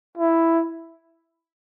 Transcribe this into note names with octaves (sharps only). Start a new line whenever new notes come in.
E4